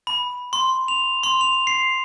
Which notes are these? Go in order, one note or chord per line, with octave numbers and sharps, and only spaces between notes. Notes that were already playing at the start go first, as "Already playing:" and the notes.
B5
C6
F7
C6
F7
C7